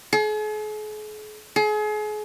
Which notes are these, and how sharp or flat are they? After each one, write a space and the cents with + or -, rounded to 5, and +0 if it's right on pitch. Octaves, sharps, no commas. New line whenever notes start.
G#4 +45
G#4 +35